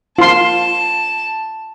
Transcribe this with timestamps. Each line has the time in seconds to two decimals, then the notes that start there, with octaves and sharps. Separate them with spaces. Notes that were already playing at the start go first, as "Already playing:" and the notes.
0.18 F4 A5 C6